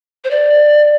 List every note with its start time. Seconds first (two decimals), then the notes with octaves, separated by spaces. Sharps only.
0.24 C5
0.30 D5